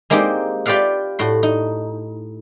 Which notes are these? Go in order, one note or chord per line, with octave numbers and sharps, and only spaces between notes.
G#3 A#3 C4 D#4 G4
F4 G4 B4 D5 F5 F#5
A2 F#4 C6
D#4